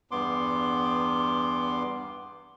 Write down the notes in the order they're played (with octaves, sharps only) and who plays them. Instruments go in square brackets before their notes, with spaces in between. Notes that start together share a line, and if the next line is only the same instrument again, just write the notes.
[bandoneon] E2 G2 B3 C6 D6